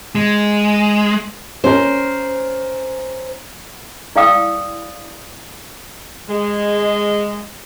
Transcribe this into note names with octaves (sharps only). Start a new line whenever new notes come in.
G#3
C#4 A#4 C5
E4 D5 F5 G5 D#6 E6
G#3